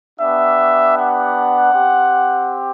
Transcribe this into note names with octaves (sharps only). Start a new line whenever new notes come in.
B3 D4 G4 E5
F#5
C4 G4